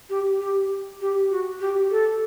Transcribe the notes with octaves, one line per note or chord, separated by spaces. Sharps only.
G4
G4
G4
F#4
G4
A4